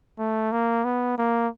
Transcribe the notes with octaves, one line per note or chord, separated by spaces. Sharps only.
A3
A#3
B3
A#3